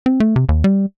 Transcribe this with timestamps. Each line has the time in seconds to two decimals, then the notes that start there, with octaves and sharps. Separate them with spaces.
0.06 C4
0.20 A3
0.36 C3
0.49 D#2
0.64 G3